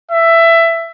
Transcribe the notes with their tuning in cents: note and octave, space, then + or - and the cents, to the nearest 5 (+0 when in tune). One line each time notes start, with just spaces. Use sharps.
E5 +15